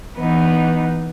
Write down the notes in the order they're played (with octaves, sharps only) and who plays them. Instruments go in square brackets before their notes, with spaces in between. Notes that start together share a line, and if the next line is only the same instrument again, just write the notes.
[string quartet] E3 B3 D#4